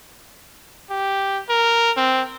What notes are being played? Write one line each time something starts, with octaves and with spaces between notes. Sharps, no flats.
G4
A#4
C4